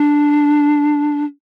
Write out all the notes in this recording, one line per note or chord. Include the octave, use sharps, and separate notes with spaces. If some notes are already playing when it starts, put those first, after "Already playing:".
Already playing: D4